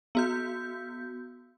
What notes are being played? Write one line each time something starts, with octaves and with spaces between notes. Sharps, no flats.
B3 F#4 G6